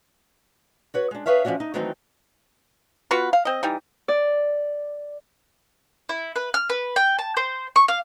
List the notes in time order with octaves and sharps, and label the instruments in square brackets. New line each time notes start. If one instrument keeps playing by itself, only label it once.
[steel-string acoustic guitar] F#4 B4 C#5
G#3 D4
G#4 B4 C#5 E5 F5
F3 G3 C#4 D4 F#4
D#4
D#3 E3 F#3 A3 C4 D#4
[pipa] B3 F4 F#4 B4
F5
C4 D#5
E3 G3 D#4
[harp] D5
[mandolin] E4
B4
F6
B4
G5
A5
C5
C#6
F5